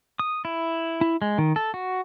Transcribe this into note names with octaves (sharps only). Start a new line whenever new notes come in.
D#6
E4
E4
G#3
D#3
A4
F#4